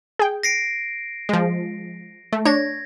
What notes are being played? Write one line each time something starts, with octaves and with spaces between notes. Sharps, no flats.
G#4 G5
A#6 C7 D7
F3 G#3
A3
D4 C#5 G#6 A#6